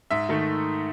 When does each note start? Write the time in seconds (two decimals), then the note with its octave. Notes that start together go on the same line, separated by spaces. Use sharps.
0.11 G#2 E5
0.29 D#3 A3